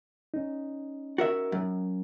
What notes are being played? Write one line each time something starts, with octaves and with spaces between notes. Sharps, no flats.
C#4 D#4
F#4 A#4 E5
F#2